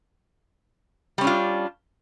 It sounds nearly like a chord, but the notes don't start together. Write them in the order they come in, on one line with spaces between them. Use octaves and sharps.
G3 C#4 D4 F4